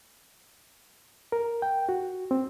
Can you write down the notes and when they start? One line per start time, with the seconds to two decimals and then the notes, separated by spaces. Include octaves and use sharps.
1.32 A#4
1.62 G5
1.89 F#4
2.31 C4